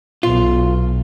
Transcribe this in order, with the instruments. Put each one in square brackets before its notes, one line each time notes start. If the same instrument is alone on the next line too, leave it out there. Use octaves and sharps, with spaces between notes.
[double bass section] B1 [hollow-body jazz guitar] F4